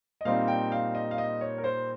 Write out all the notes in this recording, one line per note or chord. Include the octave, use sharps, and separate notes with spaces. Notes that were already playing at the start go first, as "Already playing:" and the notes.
D#5
A#2 G3 C4 D#4 F5
G5
F5
D#5
F5
D#5
C#5
A#4
C5